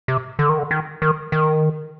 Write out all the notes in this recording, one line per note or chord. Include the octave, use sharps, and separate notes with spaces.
C3
D3
D#3
D3
D#3
D#3
D#3